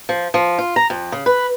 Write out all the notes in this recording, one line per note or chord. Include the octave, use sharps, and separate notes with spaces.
F3
F3
F4
A#5
F2
C#3
B4